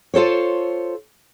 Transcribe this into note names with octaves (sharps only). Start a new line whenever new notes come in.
F4 A4 C5 C#5